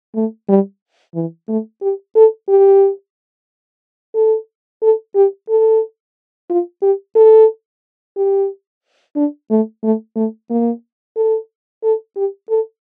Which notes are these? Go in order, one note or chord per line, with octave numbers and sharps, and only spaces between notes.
A3
G3
E3
A3
G4
A4
G4
A4
A4
G4
A4
F4
G4
A4
G4
D4
A3
A3
A3
A#3
A4
A4
G4
A4